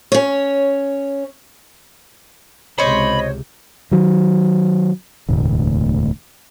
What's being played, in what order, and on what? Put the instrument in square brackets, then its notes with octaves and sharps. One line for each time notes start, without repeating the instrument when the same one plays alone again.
[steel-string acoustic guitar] C#4 C#5
[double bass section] C#2 C3 [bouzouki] C5 C#5 [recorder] D#5 [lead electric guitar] B5
[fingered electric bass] D#3 F#3
E1 D2 A2